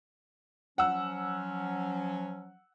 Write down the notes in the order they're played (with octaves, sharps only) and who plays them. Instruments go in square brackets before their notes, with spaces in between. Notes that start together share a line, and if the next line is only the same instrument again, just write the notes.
[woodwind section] F3 F#3 C#4 [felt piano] F#5 E6